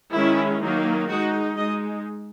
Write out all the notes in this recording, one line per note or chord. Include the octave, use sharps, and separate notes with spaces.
D#3 G#3 C#4 E4
D#3 F#3 A#3 D#4
G#3 D#4 F#4
G#3 D#4 D#5